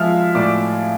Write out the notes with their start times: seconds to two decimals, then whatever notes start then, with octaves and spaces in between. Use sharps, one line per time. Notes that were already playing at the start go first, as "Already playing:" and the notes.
Already playing: F3 G#3 E5 F5 E6 F6
0.35 A2 D5 D6